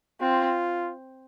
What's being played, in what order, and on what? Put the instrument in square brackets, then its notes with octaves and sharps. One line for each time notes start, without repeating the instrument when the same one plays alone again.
[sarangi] C4 [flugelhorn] F4